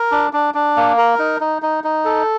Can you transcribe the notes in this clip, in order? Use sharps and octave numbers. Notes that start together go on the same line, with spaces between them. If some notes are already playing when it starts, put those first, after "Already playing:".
Already playing: A#4
D4
D4
D4
A#3
A#4
D#4
D#4
D#4
D#4
A4